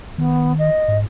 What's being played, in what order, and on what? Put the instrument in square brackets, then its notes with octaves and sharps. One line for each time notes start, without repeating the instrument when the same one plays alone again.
[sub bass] D#3 [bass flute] B3
[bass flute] D#5
[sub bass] G#2